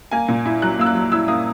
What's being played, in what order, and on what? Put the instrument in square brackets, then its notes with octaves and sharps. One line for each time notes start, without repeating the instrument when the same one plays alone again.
[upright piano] A#3 G#5
A#2
E4
F#3 F#6
A#3 E6
F#6
F#3
E4 E6
A#3 D#6